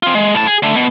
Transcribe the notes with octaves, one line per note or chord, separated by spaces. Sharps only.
C4 F4
G#3
A2 A5
G#4
D3 A3
B2